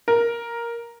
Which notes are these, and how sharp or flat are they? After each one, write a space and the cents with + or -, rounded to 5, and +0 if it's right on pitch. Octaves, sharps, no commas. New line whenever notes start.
A#4 +5